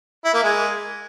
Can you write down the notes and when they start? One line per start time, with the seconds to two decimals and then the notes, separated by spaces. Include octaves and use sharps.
0.25 E4
0.34 A#3
0.43 G#3